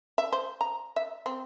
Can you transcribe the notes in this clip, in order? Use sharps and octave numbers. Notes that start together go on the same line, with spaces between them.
E5
C5
A#5
E5
C4